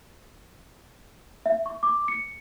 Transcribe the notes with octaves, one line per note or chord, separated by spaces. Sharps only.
E5
C#6
D6
C#7